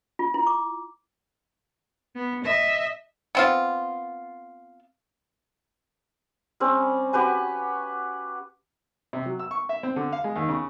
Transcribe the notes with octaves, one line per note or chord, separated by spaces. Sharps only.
F4
E4
D6
B3
D#5 E5
B3 C4 F4
G3 C4 C#4
F#4 G4 B4 G#5
C3
F#3
E6
C#6
E5
C4
D3
F5
G#3
D#2
C#3